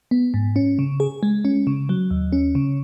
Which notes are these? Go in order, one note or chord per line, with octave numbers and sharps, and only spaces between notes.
B3
G#2
C#4
C#3
G#4
G#3
C#4
C#3
F#3
D#2
C#4
C#3